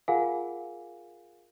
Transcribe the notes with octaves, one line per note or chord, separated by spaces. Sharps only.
F4 G#4 A#4 F5 F#5 G#5